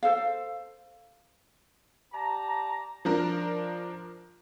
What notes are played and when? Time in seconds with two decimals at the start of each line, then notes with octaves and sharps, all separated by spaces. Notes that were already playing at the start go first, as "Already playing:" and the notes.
0.03 A4 C5 F5
2.13 G4 D5 A5 A#5
3.05 F3 D4 A#4